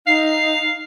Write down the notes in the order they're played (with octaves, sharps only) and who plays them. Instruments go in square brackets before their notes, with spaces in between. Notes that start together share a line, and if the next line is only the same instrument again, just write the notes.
[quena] D#4 [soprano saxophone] F5 [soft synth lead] C7